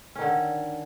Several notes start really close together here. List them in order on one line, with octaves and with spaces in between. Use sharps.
C#4 D#3 D3